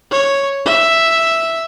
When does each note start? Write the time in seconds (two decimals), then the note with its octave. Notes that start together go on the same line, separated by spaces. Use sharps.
0.11 C#5
0.66 E5